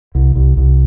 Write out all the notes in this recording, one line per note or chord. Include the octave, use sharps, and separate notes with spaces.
C2
C2
C2